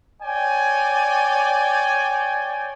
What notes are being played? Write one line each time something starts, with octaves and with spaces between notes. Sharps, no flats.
C#5 D5 G5 G#5